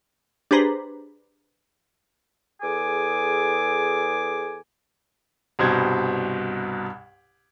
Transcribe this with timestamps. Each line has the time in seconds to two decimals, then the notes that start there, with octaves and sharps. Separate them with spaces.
0.51 D4 G4 G#4 B4 C5 A#5
2.61 E2 G#4 A4 G#5 D6
5.59 C2 G2 B2 C5 G#6